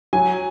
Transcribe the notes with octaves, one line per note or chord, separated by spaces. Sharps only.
F#3 G#5